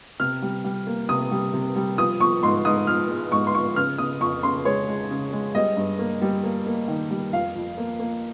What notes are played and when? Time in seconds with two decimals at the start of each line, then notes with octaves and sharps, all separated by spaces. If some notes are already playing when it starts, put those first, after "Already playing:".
0.20 C3 F6
0.42 G3
0.64 G3
0.87 A#3
1.09 C3 D#6
1.31 G3
1.54 C3
1.76 G3
1.98 F3 D#6
2.20 F3 C#6
2.43 G#2 C6
2.65 G#2 D#6
2.87 F3 F6
3.10 G#3
3.32 G#2 C#6
3.47 C6
3.54 F3 C#6
3.76 C#3 F6
3.98 C#3 D#6
4.21 F2 C#6
4.43 C#3 C6
4.65 G#3 C#5
4.88 G#3
5.11 C#3
5.32 G#3
5.55 G3 D#5
5.77 G2
5.99 A#3
6.22 G3
6.44 A#3
6.66 A#3
6.88 D#3
7.11 G3
7.33 F2 F5
7.55 F2
7.77 A#3
8.00 A#3